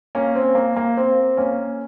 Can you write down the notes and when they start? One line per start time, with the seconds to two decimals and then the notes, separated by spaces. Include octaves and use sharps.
0.15 A#3 C#4
0.35 C4
0.55 A#3
0.76 A#3
0.97 C4
1.37 A#3 C#4